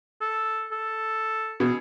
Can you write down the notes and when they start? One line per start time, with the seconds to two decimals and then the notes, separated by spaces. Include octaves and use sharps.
0.21 A4
0.72 A4
1.60 B2 G#4